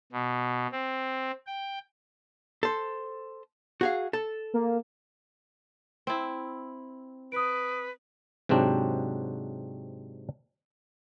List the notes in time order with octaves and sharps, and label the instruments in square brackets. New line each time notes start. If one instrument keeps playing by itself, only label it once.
[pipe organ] B2
C4
G5
[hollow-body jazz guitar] A4 C5
F#4 G#4 F5
A4
[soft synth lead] A#3
[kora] C4 E4
[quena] B4 [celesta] D#6 D7
[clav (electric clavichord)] G#2 C3 F#3 C4 D4 F#4